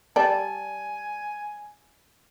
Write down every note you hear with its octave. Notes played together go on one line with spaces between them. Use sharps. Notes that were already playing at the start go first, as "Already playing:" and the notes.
G3 D5 G#5 A5